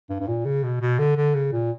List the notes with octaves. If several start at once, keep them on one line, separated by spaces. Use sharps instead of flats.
G2
G2
A#2
C#3
B2
B2
D3
D3
C#3
A#2